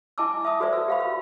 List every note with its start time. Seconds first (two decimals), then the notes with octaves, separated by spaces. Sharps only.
0.18 E4 D#5 G#5 A5 D6 E6
0.45 E5 A5 D#6
0.60 F#4 A4 B4 C5 D5 E5
0.73 E6
0.88 G4 F5 B5
1.00 F#4 F5